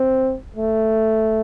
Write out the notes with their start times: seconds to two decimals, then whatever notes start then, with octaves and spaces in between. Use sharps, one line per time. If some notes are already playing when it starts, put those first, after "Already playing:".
Already playing: C4
0.56 A3